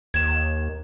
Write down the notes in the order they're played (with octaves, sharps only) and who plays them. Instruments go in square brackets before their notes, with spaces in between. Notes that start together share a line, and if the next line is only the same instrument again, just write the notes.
[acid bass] D#2 [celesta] G#6 E7